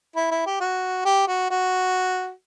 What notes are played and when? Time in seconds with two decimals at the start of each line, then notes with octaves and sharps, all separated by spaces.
0.16 E4
0.31 E4
0.46 G4
0.60 F#4
1.05 G4
1.28 F#4
1.50 F#4